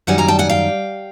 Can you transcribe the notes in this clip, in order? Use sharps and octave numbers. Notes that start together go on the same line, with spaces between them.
F#2 D#3 G3 F#5 G#5
G#5 A#5
G5 A5
F#5 G#5
F5 G5